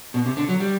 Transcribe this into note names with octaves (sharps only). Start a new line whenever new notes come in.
B2
C3
D3
F#3
G3